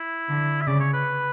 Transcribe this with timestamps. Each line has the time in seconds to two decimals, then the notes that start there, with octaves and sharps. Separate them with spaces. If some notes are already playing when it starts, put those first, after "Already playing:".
Already playing: E4
0.29 D3
0.62 E5
0.67 C#3 D5
0.80 C#5
0.93 B4